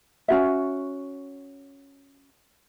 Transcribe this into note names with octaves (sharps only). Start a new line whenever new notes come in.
C#4 F#4 E5